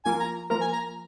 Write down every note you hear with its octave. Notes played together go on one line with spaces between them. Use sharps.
F3 A#3 F4 A#4 G#5
A#5
F3 A#3 F4 A#4 A#5
G#5
A#5